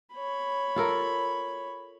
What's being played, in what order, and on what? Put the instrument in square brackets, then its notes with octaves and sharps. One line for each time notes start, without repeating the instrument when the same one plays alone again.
[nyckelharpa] C#5 B5
[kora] F4 A4 A#4